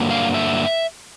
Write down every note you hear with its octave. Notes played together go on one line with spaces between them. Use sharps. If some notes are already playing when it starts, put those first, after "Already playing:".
Already playing: G2 D3 F#3 A#3
F5
E5